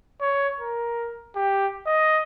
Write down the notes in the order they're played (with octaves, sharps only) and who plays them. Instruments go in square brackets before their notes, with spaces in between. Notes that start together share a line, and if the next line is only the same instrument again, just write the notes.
[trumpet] C#5
A#4
G4
D#5